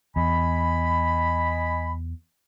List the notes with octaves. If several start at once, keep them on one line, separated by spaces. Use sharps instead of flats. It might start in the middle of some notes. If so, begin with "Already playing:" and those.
E2 D#5 G#5 B5